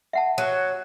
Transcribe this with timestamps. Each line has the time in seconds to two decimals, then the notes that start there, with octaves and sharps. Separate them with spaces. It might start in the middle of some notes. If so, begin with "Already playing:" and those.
0.13 E5 F#5 A5
0.38 F#3